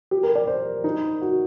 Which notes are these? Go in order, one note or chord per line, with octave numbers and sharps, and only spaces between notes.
G4
A#4
D5
C5
D#4
F#4